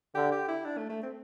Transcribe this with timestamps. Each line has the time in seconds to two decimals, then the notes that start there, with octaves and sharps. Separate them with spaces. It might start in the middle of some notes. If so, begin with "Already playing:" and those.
0.15 D3 G4
0.32 G4
0.48 E4
0.65 D4
0.78 A3
0.89 A3
1.03 C4